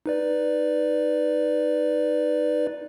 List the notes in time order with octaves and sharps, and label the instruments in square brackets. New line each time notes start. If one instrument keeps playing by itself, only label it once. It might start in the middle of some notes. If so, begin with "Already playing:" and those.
[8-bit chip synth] D#4 B4 D5